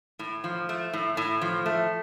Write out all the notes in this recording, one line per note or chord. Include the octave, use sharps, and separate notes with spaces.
A2
F3
A3
A2
A2
F3
A3